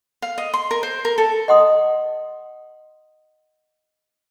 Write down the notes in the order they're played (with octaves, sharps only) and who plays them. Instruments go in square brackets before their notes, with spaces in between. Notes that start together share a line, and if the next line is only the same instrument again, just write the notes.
[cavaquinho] F5
D#5
C6
A#4
C5
A#4
A4
[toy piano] D#5 F#5 C6 D#6